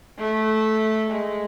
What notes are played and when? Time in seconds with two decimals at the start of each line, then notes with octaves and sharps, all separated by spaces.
0.18 A3
1.10 G#3